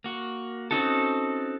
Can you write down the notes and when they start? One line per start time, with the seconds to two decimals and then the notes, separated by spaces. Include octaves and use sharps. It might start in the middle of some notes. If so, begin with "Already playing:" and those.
0.04 A#3 F#4
0.71 C4 C#4 D#4 F#4 A4